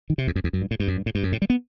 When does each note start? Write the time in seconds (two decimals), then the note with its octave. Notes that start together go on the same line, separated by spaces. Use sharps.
0.10 D#3
0.18 C3
0.27 E2
0.36 F#2
0.44 E2
0.53 F#2
0.62 G2
0.71 A2
0.80 G2
0.88 F#2
0.97 G2
1.06 A2
1.15 G2
1.23 F#2
1.32 A2
1.42 G3
1.50 B3